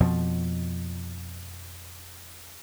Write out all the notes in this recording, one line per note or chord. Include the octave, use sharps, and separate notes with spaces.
F2 B2 F3